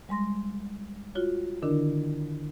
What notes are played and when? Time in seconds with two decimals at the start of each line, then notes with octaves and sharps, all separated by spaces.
0.09 G3 G#3 C6 A#6
1.15 F4 F#4 C#5
1.62 D3 D#3 D4 E4 A#4